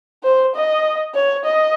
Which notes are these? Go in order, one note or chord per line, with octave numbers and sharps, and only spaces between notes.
C5
D#5
C#5
D#5